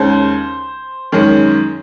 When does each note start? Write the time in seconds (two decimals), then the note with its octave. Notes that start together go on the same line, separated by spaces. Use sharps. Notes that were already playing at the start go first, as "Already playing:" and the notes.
Already playing: D#2 C#3 G#3 C#4 C5
1.12 F#2 D#3 G#3 C#4